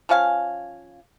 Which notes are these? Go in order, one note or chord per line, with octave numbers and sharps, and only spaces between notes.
F3 C#4 F5 G#5